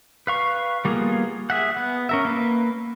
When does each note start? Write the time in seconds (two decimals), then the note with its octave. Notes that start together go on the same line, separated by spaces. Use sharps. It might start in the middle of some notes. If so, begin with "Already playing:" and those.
0.27 B4 F5 C#6
0.85 G3 A#3 B3 F4 G#4
1.50 G#4 E5 F#5
1.77 B3
2.09 C#4 A#4 E5
2.25 A#3 B4